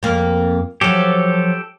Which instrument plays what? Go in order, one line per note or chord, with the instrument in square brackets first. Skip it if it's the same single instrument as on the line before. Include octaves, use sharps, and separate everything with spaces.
[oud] F2 A#3
[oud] F3 F#3 [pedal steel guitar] G4 A4